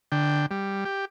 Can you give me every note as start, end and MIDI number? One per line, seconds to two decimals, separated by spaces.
0.12 0.46 50
0.12 0.46 79
0.51 0.84 55
0.85 1.05 67